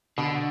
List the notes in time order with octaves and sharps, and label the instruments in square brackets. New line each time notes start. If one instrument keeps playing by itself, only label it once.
[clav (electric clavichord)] B2 [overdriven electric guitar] D3